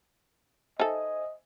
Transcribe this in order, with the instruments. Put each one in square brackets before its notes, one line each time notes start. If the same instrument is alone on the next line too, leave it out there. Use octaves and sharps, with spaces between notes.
[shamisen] D#4 A4 [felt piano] C5 E5 G#5 [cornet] D#5